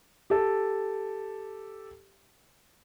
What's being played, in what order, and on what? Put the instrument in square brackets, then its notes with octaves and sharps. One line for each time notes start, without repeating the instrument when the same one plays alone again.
[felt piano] G4 A4